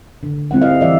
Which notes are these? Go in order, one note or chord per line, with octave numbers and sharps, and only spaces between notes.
D3
G3 C4 E4 F#5
D#5 F5
E3 D5 E5